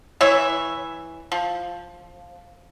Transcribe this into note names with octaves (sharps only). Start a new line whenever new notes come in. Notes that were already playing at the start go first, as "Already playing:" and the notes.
E3 E4 C#5 E5
F3